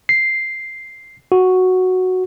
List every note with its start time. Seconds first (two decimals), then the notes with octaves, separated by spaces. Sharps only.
0.09 C7
1.32 F#4